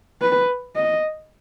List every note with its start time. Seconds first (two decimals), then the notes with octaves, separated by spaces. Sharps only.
0.22 B4
0.75 D#5